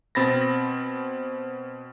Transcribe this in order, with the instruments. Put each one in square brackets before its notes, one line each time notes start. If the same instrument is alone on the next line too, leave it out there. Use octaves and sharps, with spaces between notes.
[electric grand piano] B2 C4 B5 A6 A#6